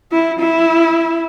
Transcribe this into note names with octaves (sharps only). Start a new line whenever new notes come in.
E4
E4